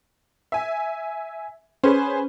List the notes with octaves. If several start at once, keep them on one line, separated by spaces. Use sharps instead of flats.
E5 G#5
C#4 G#4 B4 C5